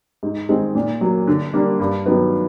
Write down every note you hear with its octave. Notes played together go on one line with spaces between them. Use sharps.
G#2
D#3 G#3 C4
A#2
F#3 A#3
D3
G3 A#3 D4
G2
D#3 F#3 B3